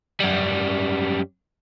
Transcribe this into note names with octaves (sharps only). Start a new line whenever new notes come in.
F#2 G3